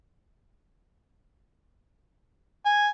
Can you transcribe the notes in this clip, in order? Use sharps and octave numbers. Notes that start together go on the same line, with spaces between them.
G#5